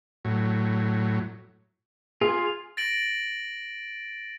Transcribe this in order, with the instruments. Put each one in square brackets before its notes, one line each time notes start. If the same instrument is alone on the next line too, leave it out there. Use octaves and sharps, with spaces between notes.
[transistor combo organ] A2 F#3
[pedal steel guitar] F4 [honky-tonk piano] G#4
[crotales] A6 A#6 D7 F#7